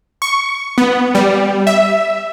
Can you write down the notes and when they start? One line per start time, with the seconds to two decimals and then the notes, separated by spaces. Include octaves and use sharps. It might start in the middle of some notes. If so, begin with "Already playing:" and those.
0.22 C#6
0.78 B3
1.15 G3
1.67 E5